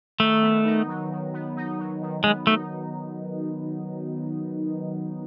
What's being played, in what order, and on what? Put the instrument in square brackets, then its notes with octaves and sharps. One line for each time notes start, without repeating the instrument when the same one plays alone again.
[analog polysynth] D#3 [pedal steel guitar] A3
[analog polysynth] B3
D#4
F#3
D#3
B3
D#4
F#3
D#3
[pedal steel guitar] G#3 [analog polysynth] B3
[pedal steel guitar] A3 [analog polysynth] D#4